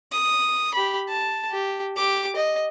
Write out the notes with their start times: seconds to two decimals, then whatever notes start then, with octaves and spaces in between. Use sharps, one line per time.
0.12 D#6
0.74 G4 B5
1.09 A5
1.51 G4
1.97 G4 D6
2.36 D#5